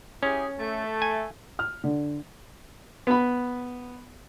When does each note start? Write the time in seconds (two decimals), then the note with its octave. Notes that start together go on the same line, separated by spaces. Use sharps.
0.23 C#4 E4 G4 G#4
0.59 A3
1.02 G#5
1.59 F6
1.84 D3
3.07 B3 B5